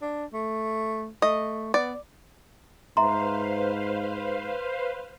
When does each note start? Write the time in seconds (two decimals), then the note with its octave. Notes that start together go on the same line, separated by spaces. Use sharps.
0.01 D4
0.33 A3
1.22 A3 D#5
1.74 B3 D5
2.97 G#2 B4 C5 E5 F5 A#5 C6